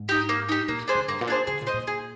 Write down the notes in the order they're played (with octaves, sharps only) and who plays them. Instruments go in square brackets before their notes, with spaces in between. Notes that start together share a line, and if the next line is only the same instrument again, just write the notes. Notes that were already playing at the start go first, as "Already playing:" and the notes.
Already playing: [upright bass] G#2
[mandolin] D#4 G4
A#3
D#4 G4
[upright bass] A#2 [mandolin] A#3
[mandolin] D4 G#4 C5
[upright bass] D3
[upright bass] G2 [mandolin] A#3
[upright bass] A#2
[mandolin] D4 G#4 C5
[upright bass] D3 [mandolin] G#4
[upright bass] A#2
[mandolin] C5 D#5
[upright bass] A#2
[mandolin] G#4